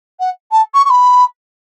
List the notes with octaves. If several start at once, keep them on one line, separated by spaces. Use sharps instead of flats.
F#5
A5
C#6
C#6
B5